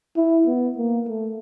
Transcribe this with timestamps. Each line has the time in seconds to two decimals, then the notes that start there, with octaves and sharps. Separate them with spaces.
0.17 E4
0.47 B3
0.77 A#3
1.08 A3